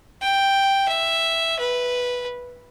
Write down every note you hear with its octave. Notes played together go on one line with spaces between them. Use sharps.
G5
E5
B4